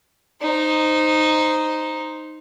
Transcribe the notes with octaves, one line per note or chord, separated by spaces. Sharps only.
D#4 C5